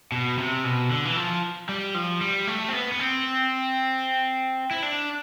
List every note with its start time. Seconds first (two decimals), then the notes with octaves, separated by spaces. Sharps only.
0.12 B2
0.38 C3
0.64 B2
0.91 D3
1.05 E3
1.16 F3
1.69 G3
1.95 F3
2.21 G3
2.47 A3
2.68 C4
2.73 B3
2.92 B3
2.99 C4
4.71 E4
4.83 D4